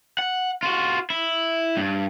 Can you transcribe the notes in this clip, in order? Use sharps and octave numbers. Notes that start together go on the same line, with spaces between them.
F#5
F4 F#4
E4
G2